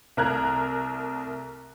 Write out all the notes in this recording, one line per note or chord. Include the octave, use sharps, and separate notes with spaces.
C2 A3 A#4 A#5 F#6 G#6